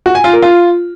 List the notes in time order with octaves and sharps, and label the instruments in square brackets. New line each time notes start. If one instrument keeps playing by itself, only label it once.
[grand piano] F#4
G#5
F4
A#4
F4